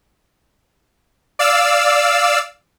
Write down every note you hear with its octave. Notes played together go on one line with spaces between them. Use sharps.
D5 F5 E6